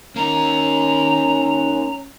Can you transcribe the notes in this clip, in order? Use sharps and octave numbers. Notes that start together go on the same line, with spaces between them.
A#3 C#4 D#4 A#5